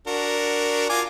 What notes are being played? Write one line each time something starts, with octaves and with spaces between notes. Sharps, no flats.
D4 F#4 A#4
F4 G#5 D6